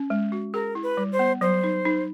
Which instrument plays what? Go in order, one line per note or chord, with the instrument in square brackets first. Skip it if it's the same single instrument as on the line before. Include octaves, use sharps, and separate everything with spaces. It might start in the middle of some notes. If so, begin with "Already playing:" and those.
Already playing: [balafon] C#4
G#3
F#4
[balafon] G#4 [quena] A#4
[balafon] E4
[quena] B4
[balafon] G3
[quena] C5
[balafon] B3
[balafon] F#3 [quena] C5
[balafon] D#4
D#4